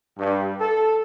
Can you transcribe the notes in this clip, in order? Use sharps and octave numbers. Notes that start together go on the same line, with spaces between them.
G2
A4